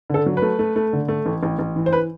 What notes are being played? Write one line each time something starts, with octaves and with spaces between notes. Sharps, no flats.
D3 A4
F#3
B4
A3
A3
A3
D3
A3
A1
A1
A1
E3
C5
B4